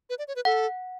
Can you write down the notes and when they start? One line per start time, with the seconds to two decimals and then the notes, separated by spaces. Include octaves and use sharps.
0.10 B4
0.19 D5
0.28 C#5
0.36 B4
0.45 A4 F#5